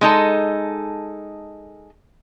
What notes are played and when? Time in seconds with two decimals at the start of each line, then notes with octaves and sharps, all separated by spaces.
0.01 G#3 D#4 A4